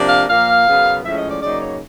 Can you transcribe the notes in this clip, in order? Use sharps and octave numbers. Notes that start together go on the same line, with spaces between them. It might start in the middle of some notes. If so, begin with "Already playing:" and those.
Already playing: C3 F3 A#3 D4
F5
A#2 F3 A#3 F5
F#2 C#3 F#3 B3
A2 F3 G#3 C#4 E5
D#5
D5
C#3 F#3 A#3 D#4 D5
C#5